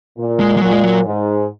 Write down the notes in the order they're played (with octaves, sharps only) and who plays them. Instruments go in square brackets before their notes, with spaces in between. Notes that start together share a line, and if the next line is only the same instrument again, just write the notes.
[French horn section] A#2
[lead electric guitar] G#3
G#3
[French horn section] A#2 [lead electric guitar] F#3
[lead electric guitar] G#3
F#3
[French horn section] G#2